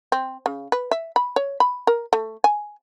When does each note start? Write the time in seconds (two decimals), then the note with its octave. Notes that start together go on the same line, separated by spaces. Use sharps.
0.12 C4
0.46 C#3
0.72 B4
0.91 E5
1.16 B5
1.36 C#5
1.60 B5
1.87 A#4
2.13 A3
2.44 G#5